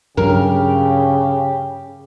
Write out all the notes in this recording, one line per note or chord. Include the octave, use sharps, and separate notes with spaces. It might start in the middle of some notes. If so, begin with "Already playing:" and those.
G2 C#3 F#3 G4 A#4